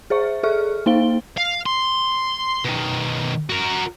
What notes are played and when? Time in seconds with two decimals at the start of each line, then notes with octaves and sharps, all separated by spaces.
0.10 G#4 C5 E5 C#6
0.43 G#4 A4 E5 C#6 F6
0.86 A#3 D#4 C5 F5 G7
1.38 F5
1.66 C6
2.65 B2 D#3
3.50 F#4 A#4